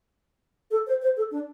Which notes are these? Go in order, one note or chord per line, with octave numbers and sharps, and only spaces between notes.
A4
C5
C5
A4
D4